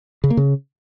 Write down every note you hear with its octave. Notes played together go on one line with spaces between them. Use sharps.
C#3
A#3
C#3